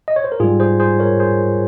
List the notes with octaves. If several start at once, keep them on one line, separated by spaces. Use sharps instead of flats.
D#5
C#5
C5
A#4
G#2 G3 F4 G#4
G#4 C5
G#4 C5
A#4 C#5
G#4 C5